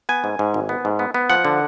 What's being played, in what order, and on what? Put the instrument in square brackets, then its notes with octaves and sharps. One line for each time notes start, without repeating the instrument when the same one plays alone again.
[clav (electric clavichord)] B3 G#5
G#2
G#2
G#1
B3
G#2
B3
B3
F3 F#5
D3